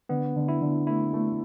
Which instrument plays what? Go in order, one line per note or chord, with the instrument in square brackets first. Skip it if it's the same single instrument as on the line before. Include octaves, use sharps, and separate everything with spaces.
[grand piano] D3 [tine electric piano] B3
[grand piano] D3
[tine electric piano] E4
[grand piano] D3
[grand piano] A3 [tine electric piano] E4
[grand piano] A3